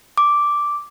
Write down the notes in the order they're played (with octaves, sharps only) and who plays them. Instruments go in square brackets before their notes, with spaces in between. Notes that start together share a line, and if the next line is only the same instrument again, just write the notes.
[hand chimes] D6